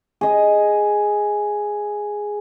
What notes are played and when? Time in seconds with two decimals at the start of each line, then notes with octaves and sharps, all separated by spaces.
0.21 G#4 D#5